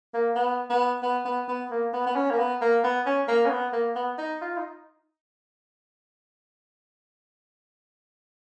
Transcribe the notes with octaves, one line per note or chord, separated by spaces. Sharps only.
A#3
B3
B3
B3
B3
B3
A#3
B3
B3
C#4
A#3
B3
A#3
B3
C#4
A#3
C#4
B3
A#3
B3
D#4
F4
D#4